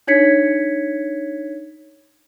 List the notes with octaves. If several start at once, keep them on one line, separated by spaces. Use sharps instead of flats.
D4 D#4 C#5 G#6 B6 C#7